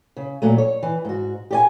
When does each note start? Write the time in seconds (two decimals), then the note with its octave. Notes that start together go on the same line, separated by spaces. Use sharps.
0.17 C#3
0.42 A#2 F#3 A3
0.58 C#5
0.83 E3
1.05 G#2 F#4
1.51 G4 D5 G#5